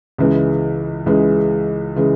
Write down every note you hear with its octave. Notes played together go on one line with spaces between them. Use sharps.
C#2 C#3 E3 G#3
C#2 C#3 E3 G#3
C#3 E3 G#3